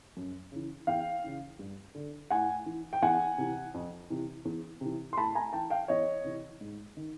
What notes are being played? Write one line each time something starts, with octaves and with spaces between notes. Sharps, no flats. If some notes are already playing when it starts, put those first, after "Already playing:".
F#2
C#3 E3
E2 F5 G5
C#3 E3
G2
D3
A2 F#5 G#5
E3
G5
E2 F#5 G#5
C3 E3
F2
C3 E3
E2
C3 E3
C6
A2 A5 B5
G#5 A#5
E3 G5 A5
F5 G5
E2 C#5 D#5
C3 E3
G#2
D#3